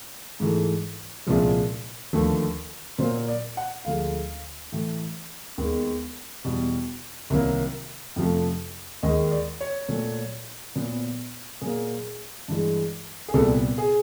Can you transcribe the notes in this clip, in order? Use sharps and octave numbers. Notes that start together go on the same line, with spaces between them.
G#2 E3 A3
C2 A#2 F3 G#3
D#2 D3 F3 A3
A#2 F#3 A#3 C5
D5
F#5
D2 D3 F3 G#3 F5
A2 E3 A3
D#2 D#3 G#3 B3
E2 B2 G3
C2 C3 D#3 F#3 A#3
F2 C3 F3 A3
D#2 D#3 G#3 D#5
D5
C#5
A#2 F#3 A3
A#2 F#3 B3
A#2 F#3 A#3 G#4
G2 E3 G#3
G#4
C2 A#2 G3 B3 A4
G#4